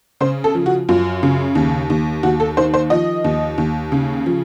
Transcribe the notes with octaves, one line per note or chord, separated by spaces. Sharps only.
C#3 C5
A4
F3
F#4
F#2 F4
C#3
D#2
D#2
D#2 F#4
A4
D#3 C5
C5
F3 D#5
D#2
D#2
C#3
F3